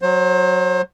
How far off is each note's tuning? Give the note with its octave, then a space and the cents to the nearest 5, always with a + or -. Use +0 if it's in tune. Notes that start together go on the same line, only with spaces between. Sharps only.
F#3 +0 C5 +30